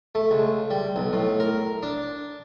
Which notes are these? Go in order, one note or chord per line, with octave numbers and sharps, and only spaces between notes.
A3
C#2
G3
B1
A2
A#4
D4